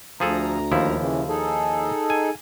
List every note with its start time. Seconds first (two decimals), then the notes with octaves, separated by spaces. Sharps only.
0.20 D2 F3 G#4 A4 A#5
0.72 D#2 F3 E4
1.00 C#3 E3
1.29 D#4 G#4 A4
2.10 G#5